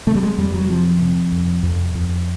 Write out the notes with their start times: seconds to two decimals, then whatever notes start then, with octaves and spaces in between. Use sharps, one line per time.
0.07 C3 A3
0.15 G3
0.23 G#3
0.38 F2 G3
0.54 F#3
0.69 C3 F3
1.01 C3
1.32 F2
1.63 F2
1.95 F2